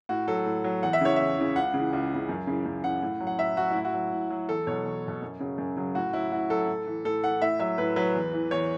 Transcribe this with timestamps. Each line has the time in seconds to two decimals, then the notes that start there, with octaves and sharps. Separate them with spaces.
0.09 A2 F#4
0.28 F#3 A4
0.46 A2
0.64 F#3
0.83 E2 F#5
0.93 E5
1.01 C#3 E3 C#5
1.16 E2 E5
1.37 C#3 E3
1.55 C#2 F#5
1.74 C#3 E3
1.93 C#2
2.10 C#3 E3
2.29 F#2
2.47 C#3 E3
2.66 F#2
2.84 C#3 E3 F#5
3.02 A2
3.20 F#3
3.27 F#5
3.39 A2 E5
3.57 F#3 F#4
3.71 A2 E4
3.85 F#4
3.94 F#3
4.12 A2
4.30 F#3
4.48 E2 A4
4.67 B2 F#3 C#5
4.85 E2
5.04 B2 F#3
5.22 F#2
5.40 C#3 F#3
5.58 F#2
5.76 C#3 F#3
5.95 A2 F#4
6.13 F#3 E4
6.31 A2 F#4
6.50 F#3 A4
6.68 A2
6.86 E3
7.05 A2 A4
7.23 E3 F#5
7.42 A2 E5
7.59 F#3 E5
7.78 A2 B4
7.96 F#3 B4
8.15 E2
8.33 E3
8.51 E2 C#5